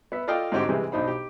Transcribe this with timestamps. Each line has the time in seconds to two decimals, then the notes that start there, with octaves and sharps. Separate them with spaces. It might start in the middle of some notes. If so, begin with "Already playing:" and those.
0.12 B3 E5
0.27 F4 A4 D5 D#5 F5 G5
0.52 G#2 D3 C4 F#4 G4
0.69 C3 E3 G3 G#3 C4
0.92 B1 D4 D#4 C5 B5
1.08 G4